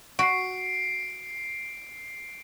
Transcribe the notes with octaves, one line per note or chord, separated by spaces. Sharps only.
F#4 C7 D7